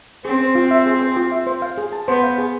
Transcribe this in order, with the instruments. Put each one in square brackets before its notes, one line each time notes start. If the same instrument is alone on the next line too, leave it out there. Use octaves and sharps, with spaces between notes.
[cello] C4 [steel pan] G#4
[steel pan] C5
F4
E5
G#4
C5
F4
E5
C5
F5
G#4
A5
[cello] B3 [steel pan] C5
[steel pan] F5
G#4